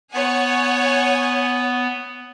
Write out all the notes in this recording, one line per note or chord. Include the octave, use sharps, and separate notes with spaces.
B3 C#5 F#5 G#5